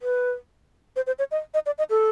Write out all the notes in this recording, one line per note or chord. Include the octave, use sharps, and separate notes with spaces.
B4
C5
C5
C#5
D#5
D#5
D5
D#5
A4